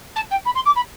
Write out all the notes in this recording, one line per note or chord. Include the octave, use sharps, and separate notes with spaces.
A5
G5
B5
C6
D6
B5